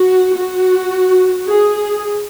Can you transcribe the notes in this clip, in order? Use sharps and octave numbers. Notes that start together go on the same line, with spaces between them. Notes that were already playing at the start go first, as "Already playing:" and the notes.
Already playing: F#4
F#4
G#4